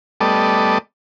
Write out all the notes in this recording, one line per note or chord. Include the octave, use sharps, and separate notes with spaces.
G3 A3 B3 A4 D5 D#5